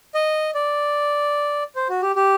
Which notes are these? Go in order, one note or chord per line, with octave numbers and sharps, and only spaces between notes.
D#5
D5
C5
F#4
G4
G4